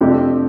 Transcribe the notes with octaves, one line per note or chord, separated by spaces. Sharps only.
F2 C3 A3 D4 G4